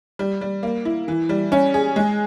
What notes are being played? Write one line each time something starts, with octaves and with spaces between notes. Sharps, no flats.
G3
G3
A#3
E4
E3
G3
C#4
G#4
G#3